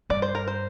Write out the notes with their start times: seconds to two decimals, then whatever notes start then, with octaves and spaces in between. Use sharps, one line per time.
0.10 G2 D5
0.22 C5
0.35 A#4
0.48 C5